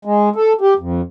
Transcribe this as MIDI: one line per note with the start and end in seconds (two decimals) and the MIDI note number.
0.05 0.29 56
0.36 0.53 69
0.61 0.74 67
0.79 1.01 41